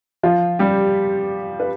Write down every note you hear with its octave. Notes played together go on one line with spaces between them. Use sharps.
F3 F4
G3 G4
B4